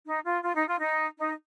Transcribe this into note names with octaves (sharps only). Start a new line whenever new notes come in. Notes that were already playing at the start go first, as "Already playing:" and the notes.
D#4
F4
F4
D#4
F4
D#4
D#4